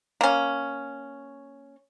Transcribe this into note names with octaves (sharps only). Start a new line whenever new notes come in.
A#3 C#4